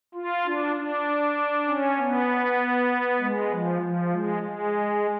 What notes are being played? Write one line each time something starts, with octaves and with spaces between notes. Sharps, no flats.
F4
D4
D4
C#4
B3
G#3
F3
F3
G#3
G#3